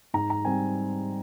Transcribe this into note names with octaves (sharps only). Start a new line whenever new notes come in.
G#2 A#5
A#5
G3 C4 G#5